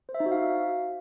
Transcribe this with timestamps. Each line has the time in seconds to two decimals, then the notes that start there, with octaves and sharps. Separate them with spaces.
0.09 C5
0.14 E5
0.20 D#4
0.26 F#4
0.32 F5